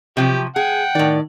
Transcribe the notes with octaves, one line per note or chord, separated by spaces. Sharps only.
C3 F3 F#3 G4
G#4 F#5 G5
A2 D#3 D5